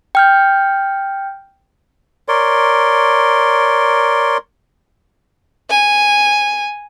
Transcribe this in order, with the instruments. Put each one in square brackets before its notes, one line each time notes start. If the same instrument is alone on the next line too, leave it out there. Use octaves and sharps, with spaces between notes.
[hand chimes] G5 F6 G6
[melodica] A#4 C#5 D5 C6
[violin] G#5